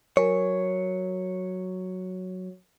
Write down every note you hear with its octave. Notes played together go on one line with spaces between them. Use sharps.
F#3 A#4 C#5 G#5